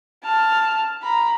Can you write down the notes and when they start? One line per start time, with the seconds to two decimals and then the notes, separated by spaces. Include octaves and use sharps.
0.24 A5 F6
1.03 A#5 B5